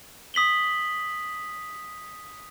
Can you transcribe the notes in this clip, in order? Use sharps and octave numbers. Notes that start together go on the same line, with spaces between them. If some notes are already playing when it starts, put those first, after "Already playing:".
D#6 B6 F#7 G7